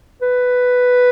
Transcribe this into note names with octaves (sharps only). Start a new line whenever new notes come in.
B4